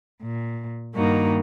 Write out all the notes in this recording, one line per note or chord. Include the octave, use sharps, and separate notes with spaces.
A#2
G2 D#3 G3 A#3 D#4 F#4